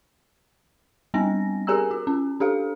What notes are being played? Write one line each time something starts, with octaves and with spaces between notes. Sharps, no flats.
G3 B3 C4 D4 A#6
G4 G#4 A#4 G#5 A#5 E6
F#4
C#4
D4 G4 A4 F5